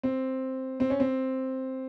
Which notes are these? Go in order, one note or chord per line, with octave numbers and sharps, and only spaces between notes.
C4
C4
C#4
C4